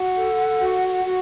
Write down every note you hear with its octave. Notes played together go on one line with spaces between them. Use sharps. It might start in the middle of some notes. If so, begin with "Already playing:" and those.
Already playing: F#4 F#5
A4
F#4
F#4